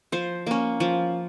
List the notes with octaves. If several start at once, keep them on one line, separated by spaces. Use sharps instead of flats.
F3 C5
A#3 C#4
F3